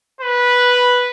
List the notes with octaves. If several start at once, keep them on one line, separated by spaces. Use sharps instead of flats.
B4